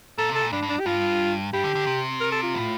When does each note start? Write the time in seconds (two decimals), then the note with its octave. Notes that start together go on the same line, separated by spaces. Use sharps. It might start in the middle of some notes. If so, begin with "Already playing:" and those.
0.18 A#2 A4
0.29 C3
0.35 A4
0.41 A#2
0.52 G2 D4
0.63 G2
0.69 D4
0.80 G4
0.86 G2 F4
1.53 G2 G4
1.64 D3
1.75 D3
1.87 C3
2.20 A#4
2.32 A4
2.43 F4
2.55 A2